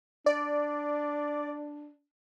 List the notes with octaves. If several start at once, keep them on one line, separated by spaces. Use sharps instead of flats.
D4 D5